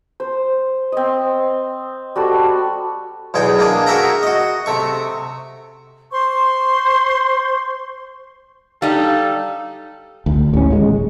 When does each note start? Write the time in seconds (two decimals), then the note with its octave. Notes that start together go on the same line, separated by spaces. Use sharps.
0.20 C5
0.92 C4 D#5
2.16 G3 F#4 A4
3.34 B1 E2 G#4 G5
3.59 A#3 D4 G#4
3.87 F#4 G#4 A#4 E5 G5 A#5
4.23 F#4 D#5
4.66 C3 A3 C#6
6.12 C5 C6 C#6
8.82 G3 D#4 A4 F5
10.26 D2
10.53 A1 C#4
10.71 D#1 G#3